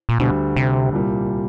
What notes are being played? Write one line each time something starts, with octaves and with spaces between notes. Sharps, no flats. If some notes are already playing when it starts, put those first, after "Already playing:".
A#2
D2 B2 D3 G3
C3
C2 A#2 G3